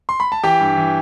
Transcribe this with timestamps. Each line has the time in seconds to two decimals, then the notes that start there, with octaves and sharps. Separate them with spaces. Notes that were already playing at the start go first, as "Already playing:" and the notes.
0.09 C6
0.20 B5
0.32 A5
0.43 E3 G4 G5
0.61 G2
0.77 E3